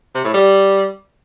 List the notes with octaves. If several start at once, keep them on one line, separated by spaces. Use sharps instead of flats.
C3
A2
G3